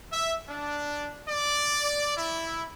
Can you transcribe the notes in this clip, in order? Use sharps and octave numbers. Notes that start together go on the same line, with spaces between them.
E5
D4
D5
E4